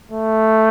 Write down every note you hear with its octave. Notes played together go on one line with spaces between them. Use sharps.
A3